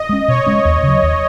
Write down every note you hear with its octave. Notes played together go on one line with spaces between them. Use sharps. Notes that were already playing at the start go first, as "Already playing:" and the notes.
Already playing: D#5
G#3 C#4
B2 C#5
G#3 C#4
D#2
C#3 F#3
D#2